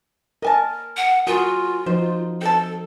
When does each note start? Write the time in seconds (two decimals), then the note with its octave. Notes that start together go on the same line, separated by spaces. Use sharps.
0.42 A#4 D#5 G#5 A5
0.97 F#5
1.27 F4 F#4 G#4 A#4
1.86 F3 D#4 C5
2.41 C4 A4 A5